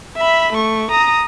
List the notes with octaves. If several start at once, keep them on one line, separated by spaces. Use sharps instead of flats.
E5 B5
A3 C#6
A#5 D#6